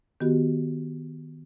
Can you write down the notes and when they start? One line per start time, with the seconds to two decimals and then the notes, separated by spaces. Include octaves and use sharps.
0.21 D#3 B3 F#4 G4